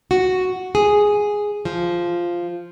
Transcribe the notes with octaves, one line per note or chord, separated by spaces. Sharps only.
F#4
G#4
F3